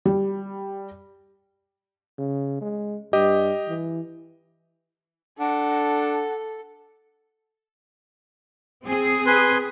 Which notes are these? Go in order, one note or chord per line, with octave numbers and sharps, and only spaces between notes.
G3
C#3
G#3
G2 G4 D#5
E3
D4 A4 F#5
C4 G#4
B4 G#5 C6